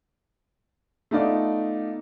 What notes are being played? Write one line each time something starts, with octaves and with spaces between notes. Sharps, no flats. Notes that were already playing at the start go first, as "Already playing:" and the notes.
A3 B3 D#4 F4 D5